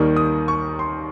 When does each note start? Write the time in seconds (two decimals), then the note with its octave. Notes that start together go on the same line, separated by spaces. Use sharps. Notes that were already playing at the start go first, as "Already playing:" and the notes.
Already playing: D#2 D#3 G3 A#3 C#6
0.16 D#6
0.48 C#6
0.79 C6